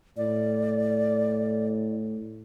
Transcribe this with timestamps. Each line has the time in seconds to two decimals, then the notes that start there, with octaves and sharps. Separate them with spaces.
0.17 A2 D5